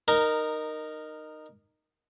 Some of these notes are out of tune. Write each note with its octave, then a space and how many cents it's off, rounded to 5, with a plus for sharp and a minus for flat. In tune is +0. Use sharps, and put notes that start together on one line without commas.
D#4 -15 A#4 +0